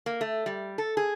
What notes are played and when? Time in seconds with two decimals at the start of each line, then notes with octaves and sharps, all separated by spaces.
0.06 A#3
0.21 A3
0.46 G3
0.78 A4
0.97 G#4